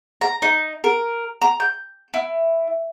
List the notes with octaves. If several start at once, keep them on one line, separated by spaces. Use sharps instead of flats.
A#5
D#4
A#4
A#5
G6
E4